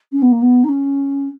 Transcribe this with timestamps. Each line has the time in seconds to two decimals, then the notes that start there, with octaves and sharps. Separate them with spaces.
0.12 C#4
0.22 B3
0.31 A#3
0.42 B3
0.63 D#4
0.68 C#4